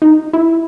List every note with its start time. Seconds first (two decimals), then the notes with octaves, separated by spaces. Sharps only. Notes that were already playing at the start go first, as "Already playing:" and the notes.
0.02 D#4
0.33 E4